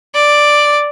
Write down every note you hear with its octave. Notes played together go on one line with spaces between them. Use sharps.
D5